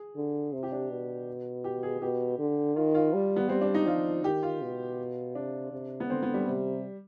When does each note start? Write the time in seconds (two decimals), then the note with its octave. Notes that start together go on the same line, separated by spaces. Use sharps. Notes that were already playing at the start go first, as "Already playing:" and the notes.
Already playing: G#4
0.16 D3
0.53 C3
0.63 G4
0.72 D4
0.91 B2
1.64 G4
1.83 G#4
2.01 B2 G4
2.39 D3
2.75 D#3 F4
2.94 F4
3.14 G3
3.36 B3
3.49 G3 C4
3.61 D4
3.74 D#4
3.87 F3 F4
4.24 D#3 G4
4.43 F4
4.62 B2
5.35 C3 D4
5.72 C3
6.00 B3
6.10 D3 C4
6.23 B3
6.34 G3
6.47 C3